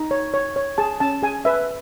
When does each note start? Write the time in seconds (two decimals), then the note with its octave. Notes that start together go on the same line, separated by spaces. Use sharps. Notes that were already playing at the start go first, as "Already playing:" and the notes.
Already playing: D#4
0.11 C#5
0.34 C#5
0.56 C#5
0.78 G#4 A5
1.00 C#4 A5
1.22 G#4 G#5
1.45 B4 E5